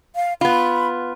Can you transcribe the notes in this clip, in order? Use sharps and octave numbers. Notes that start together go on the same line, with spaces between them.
F5
B3 F4 B5